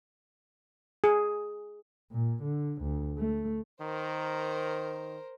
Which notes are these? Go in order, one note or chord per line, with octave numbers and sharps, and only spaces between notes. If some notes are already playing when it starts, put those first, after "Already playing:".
G#4
A#2
D3
D2
A3
D#3 A#4 C5